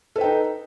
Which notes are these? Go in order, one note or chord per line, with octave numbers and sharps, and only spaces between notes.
D#4 A4 B4 G5